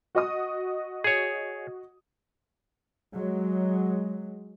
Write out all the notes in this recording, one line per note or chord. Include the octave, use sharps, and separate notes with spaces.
F#4 D#5 D#6
G#4 C#5
F#3 G#3